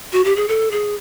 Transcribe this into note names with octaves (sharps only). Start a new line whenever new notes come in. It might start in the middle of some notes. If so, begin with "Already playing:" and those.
F#4
G4
G#4
A4
G#4